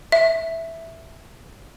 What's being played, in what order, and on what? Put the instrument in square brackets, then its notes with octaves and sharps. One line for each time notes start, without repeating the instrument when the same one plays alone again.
[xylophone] E5